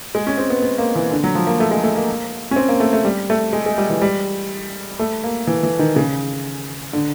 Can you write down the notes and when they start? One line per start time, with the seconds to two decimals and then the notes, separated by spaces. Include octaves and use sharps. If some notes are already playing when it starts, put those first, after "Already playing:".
0.15 G#3
0.27 C#4
0.38 C4
0.50 B3
0.62 B3
0.78 A#3
0.96 E3
1.11 D3
1.24 F#3
1.35 F3
1.47 A#3
1.60 A3
1.71 G#3
1.84 A3
1.96 A#3
2.51 C#4
2.56 C4
2.68 A#3
2.80 A3
2.93 A3
3.05 G3
3.30 A3
3.53 G#3
3.66 G#3
3.78 G3
3.90 E3
4.02 G3
4.99 A3
5.24 A#3
5.47 E3
5.63 E3
5.79 D#3
5.96 C#3
6.93 D3